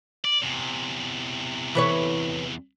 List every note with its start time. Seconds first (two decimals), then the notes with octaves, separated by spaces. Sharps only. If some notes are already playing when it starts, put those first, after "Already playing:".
0.24 D5
0.42 E2 C3
1.75 E3 B4 C#5